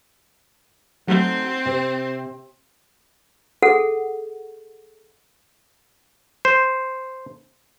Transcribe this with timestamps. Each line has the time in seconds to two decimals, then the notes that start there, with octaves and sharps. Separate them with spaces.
1.07 F#3 A3 C4 D#4
1.66 C3
3.62 G#4 A4 F#5
6.45 C5